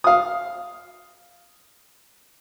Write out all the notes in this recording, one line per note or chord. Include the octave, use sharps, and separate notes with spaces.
F5 D#6